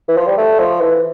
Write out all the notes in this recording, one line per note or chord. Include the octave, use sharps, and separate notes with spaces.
E3
F3
G3
A3
F3
E3